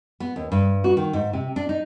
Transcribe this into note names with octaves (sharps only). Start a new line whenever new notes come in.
B3
D#2
G2
F#4
D#3
G#2
C3
D4
D#4